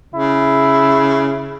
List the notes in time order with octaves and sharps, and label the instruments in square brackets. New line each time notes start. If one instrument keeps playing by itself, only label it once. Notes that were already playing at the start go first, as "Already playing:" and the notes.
[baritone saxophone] C#3 [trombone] E4